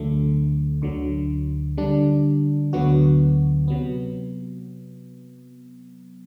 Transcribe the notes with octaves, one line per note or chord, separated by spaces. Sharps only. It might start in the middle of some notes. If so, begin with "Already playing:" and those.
Already playing: D2 D3 F#3 A3
D2 D3 F#3
D3 G3 D4
D2 D3 F#3 B3 F#4
C3 F#3 B3